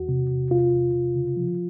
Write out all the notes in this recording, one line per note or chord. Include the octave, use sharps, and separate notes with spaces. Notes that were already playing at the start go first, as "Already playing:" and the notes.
Already playing: E2 F#4
C3
E2
C3 F4
E2
C3
C#3
F3